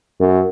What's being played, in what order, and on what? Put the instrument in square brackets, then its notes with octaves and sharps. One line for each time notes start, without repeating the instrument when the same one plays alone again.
[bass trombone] F#2